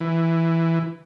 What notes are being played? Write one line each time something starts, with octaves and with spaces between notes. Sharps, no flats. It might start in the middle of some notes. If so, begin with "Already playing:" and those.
E3